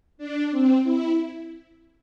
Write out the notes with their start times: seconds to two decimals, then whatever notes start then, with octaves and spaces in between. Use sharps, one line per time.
0.18 D4
0.50 C4
0.83 E4